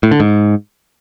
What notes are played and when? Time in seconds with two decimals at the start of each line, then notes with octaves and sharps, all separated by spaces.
0.03 A2
0.11 D3
0.20 G#2